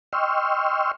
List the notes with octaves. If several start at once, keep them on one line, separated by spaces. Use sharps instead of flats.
D#5 G5 C6 C#6 E6 F6